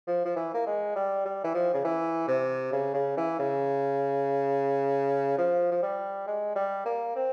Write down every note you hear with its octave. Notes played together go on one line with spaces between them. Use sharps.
F3
F3
E3
A#3
G#3
G3
G3
E3
F3
C#3
E3
C3
C#3
C#3
E3
C#3
F3
F3
G3
G#3
G3
A#3
C4